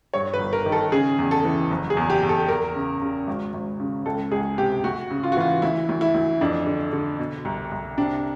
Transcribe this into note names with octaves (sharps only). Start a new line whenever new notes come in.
G2 C#5
B4
G1
A#4
D#3
A4
C#3 G#4
E2
A4
E3
F#1
G#4
E2
G4
E2
A4
E2 A#4
C#3
C#3
G#1
G#1
C#3
C#2 A4
C#2 G#4
C3 G4
D2 F#4
C#3
F4
F#4
E3 F4
D2 E4
D2
E4
D2
F2 D4
D3
D3
B2
C2
C2
C3 D4